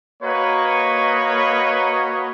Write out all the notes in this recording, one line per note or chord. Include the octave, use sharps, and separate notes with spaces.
A#3 F#4 B4 C#5 D#5